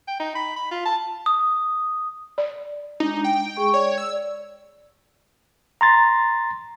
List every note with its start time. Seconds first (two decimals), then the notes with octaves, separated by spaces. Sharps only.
0.07 G5
0.20 D#4
0.35 B5
0.56 B5
0.71 F4
0.85 A5
1.26 D#6
2.38 D5
3.00 G#3 D4 D#4
3.24 G5
3.57 G#3 G#4 C#6
3.74 C#5 D5
3.98 E6
5.81 A#5 C6 A6